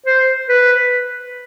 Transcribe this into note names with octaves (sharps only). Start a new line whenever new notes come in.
C5
B4